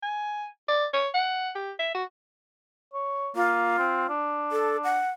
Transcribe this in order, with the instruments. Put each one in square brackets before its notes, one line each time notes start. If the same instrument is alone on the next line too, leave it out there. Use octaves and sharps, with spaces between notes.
[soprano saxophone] G#5
D5
C#5
F#5
G4
E5
F#4
[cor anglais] C#5
[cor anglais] A#3 [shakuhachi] F4
[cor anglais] C4
D4
[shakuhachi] A4
F#5